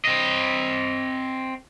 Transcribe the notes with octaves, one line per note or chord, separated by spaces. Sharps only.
C4 D#5